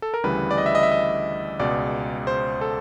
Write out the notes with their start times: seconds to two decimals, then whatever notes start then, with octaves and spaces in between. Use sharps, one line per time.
0.02 A4
0.14 A#4
0.24 D2 C#3 E3 G3 B4
0.51 D5
0.58 D#5
0.66 E5
0.75 D#5
0.83 E5
0.92 D#5
1.59 C#2 B2 G#3 D5
2.27 C5
2.61 A4